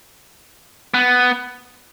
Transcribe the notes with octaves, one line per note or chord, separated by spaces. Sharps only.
B3